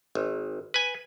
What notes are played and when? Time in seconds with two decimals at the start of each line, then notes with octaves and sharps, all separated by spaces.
0.15 G#1
0.74 B4 G#5